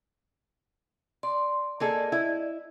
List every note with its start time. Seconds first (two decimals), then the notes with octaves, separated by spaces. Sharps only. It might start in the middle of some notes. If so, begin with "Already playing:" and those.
1.23 D5 C6
1.80 A#3 G#4 A4 D5 D#5
2.12 E4